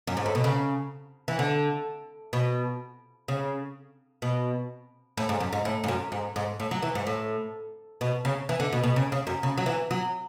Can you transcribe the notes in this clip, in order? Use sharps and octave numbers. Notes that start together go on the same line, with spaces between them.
F#2
G#2
A2
B2
C#3
E3
D3
B2
C#3
B2
A2
G#2
F#2
G#2
A2
G#2
F#2
G#2
G#2
A2
F#3
E3
G#2
A2
B2
C#3
E3
D3
B2
B2
C#3
C#3
F#2
C#3
F#3
E3
F#3